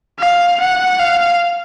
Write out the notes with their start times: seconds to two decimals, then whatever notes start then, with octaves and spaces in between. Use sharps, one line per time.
0.19 F5
0.60 F#5
0.99 F5